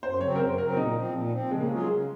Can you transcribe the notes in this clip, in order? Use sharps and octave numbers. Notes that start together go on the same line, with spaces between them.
F#2 C5
C#3 F#3 C4 C#5
A#4
F#2 C5
C#3 F#3 C4 A#4
A#2 D#4
F3 C4
A#2
F3 C4
C#3 G#3
A#3
F#3 G#3 C#4 F4 G#4
C#3